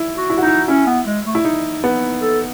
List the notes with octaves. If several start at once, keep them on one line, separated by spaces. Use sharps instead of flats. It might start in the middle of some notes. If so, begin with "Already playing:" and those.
Already playing: E4
F#4
E4
F#4
D#4 E4
C#4 E4
B3
G#3
A3
E4
D#4
B3
A4